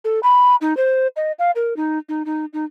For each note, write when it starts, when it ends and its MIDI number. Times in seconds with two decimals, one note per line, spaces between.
0.05 0.20 69
0.23 0.56 83
0.61 0.76 63
0.77 1.07 72
1.16 1.32 75
1.39 1.51 77
1.56 1.76 70
1.77 1.98 63
2.09 2.23 63
2.26 2.45 63
2.53 2.65 63